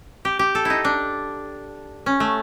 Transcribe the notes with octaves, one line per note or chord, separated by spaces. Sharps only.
G4
G4
A4
D#4 E4
D4
C#4
A3